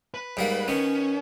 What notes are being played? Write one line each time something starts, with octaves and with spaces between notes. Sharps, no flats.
B4
G#2 G3 A#3
D#3 B3 C#4